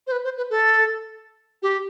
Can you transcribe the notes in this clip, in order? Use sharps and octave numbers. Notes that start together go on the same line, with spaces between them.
C5
B4
C5
B4
A4
G4